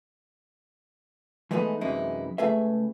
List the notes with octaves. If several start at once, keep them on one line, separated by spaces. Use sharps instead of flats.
E3 G#3 A3 B3 D#4 B4
F#2 C3 E3 G#3 D#4 E4
C#2 A3 G#4 B4 E5